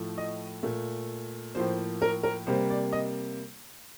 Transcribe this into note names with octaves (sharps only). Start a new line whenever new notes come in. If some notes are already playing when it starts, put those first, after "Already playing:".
Already playing: A2 F3 A3
D#5
A#2 A3
A2 F3 A#3 C5
A#4
A#4
C3 G3 A#3 C5
D5
D#5